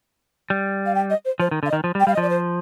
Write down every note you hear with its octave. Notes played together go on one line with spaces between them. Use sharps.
G3
F5
G5
D#5
C5
F3 C5
D#3
D3 F5
D#5
D#3
F3
G3
G5
G3 F5
D#5
F3 D5
C5